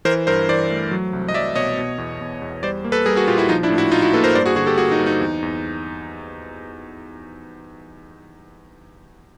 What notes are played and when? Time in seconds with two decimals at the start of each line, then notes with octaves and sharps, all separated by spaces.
0.05 E3 A#4 C5
0.27 G2 A#4 C5
0.49 E3 C5 D5
0.70 A3
0.91 F#3
1.13 C2
1.28 D#5
1.34 F#3 D5 E5
1.56 B2 C#5 D#5
1.77 B2
1.98 E2
2.21 E2
2.42 E2
2.63 G3 C5 D5
2.84 A#3
2.92 A4 B4
3.06 G3 G#4 A#4
3.16 F#4 G#4
3.28 A#2 F4 G4
3.38 E4 F#4
3.49 F3 D#4 F4
3.63 D4 E4
3.70 A2
3.78 E4 F#4
3.92 A2 D#4 F4
4.02 E4 F#4
4.13 A#3 A4 B4
4.24 A#4 C5
4.35 G2 C5 D5
4.46 F#4 G#4
4.56 D3 F#4 G#4
4.67 G4 A4
4.77 A#3 F#4 G#4
4.92 D#4
4.99 G2
5.06 D#4
5.21 E2
5.42 E2